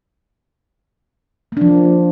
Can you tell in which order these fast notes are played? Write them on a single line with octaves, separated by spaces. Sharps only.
A#3 D4 F3